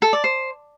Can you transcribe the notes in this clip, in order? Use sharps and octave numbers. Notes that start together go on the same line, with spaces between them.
A4
D5
C5